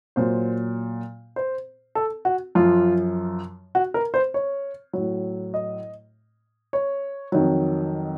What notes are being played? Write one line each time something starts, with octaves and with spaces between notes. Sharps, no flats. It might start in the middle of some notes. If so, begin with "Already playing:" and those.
A#2 F#3 C5
C5
A4
F#4
F#2 F3 F4
F#4
A#4
C5
C#5
A2 F#3
D#5
C#5
F2 D#3 F#3